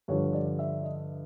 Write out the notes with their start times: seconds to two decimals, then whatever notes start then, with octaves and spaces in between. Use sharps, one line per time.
0.08 G2 D3 F3 C#5
0.33 D5
0.59 E5
0.84 D#5